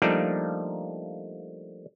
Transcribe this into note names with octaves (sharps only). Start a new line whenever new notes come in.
F3 G3 A3 A#3 D4 D#4